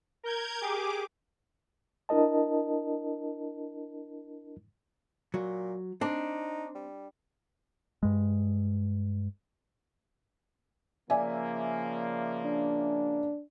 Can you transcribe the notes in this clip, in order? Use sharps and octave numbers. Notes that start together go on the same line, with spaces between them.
A#4 G6 G#6
G4 G#4 D6
D4 E4 A#4 D#5 A5
A#2 F#3
C4 D4 D#4
G3
G2 G#3
C#3 F3 A#3 D5 E5 G#5
D4